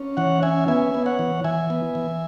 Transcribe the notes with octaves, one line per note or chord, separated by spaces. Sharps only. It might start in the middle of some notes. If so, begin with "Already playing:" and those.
Already playing: C#4
E3 C#5 F#5
C#4 E5 G#5
B3 E5 G#5
B3
C#5 F#5
E3
E3 E5 G#5
B3
E3